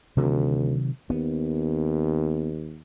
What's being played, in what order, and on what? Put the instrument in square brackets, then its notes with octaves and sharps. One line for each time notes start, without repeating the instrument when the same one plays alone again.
[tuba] D2 [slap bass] C3 D#3 F#3
[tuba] D#2 [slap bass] B3